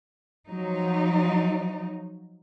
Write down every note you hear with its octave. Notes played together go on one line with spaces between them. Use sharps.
F3 F#3 D#4